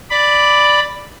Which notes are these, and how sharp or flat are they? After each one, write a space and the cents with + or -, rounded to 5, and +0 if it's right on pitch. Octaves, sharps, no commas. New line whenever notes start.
D5 +0 B5 +0